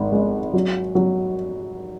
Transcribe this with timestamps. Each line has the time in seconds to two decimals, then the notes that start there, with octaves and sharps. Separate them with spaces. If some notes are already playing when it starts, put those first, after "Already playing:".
Already playing: G#1 G#2
0.12 G#3
0.54 F#3
0.95 F#3